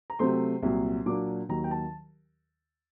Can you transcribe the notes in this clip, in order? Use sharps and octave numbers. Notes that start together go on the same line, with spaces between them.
A#5
C3 F#3 A3 C4 C6
C2 A#2 F#3
A#2 F#3 A#3 D4 D6
D#2 D#3 F#3 A#5
G5
A5